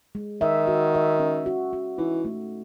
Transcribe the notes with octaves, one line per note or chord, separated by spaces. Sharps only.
G#3
D#3 E5
F#4
E5
C#4
F#4
F#4
E3 D#4
A3